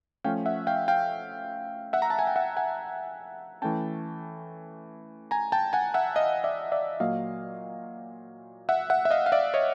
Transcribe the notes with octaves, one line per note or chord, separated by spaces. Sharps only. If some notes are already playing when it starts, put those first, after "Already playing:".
F3 A3 C#4 F5 G5
E5 F#5
F5 G5
F5 G5
E5 F#5
A#5
A5
G#5
G5
E5 F#5
F#5 G#5
E3 A3 C#4 G5 A5
G#5 A#5
G5 A5
F#5 G#5
E5 F#5
D#5 F5
D5 E5
D5 E5
A#2 F#3 A#3 D#5 F5
E5 F#5
E5 F#5
E5
D#5 F5
F5
D5 E5
C#5 D#5